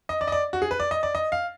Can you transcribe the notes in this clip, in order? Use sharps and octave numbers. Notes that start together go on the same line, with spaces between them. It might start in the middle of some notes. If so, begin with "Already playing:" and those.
D#5
D5
D#5
D5
F#4
G#4
B4
D5
D#5
D5
D#5
F5